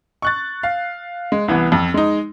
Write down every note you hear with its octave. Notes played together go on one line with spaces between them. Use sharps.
C#6 F#6 A6
F5
G#3
C2 E3 B3
F2
G#3 D#4